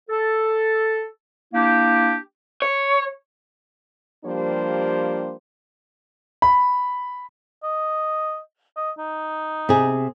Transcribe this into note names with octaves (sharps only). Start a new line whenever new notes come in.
A4
A#3 D4 E4 G4
C#5
F3 G3 A#3 D4 G4 C5
B5
D#5
D#5
D#4
C3 G#4